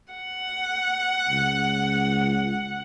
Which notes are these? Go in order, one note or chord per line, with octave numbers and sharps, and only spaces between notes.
F#5
C#2